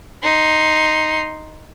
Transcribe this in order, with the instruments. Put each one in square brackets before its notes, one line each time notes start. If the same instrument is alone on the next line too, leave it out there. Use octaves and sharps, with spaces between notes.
[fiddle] D#4 C6